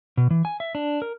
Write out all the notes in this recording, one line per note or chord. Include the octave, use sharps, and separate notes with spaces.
B2
E3
G#5
E5
D4
A#4